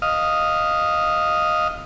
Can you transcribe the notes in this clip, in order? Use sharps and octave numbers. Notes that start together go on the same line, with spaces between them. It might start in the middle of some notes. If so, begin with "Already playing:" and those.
D#5 F5